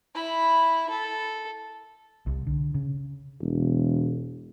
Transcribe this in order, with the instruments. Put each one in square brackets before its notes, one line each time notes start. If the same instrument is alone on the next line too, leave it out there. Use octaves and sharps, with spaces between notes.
[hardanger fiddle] E4 B5
A4
[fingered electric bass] C2
D3
C#3
[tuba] E1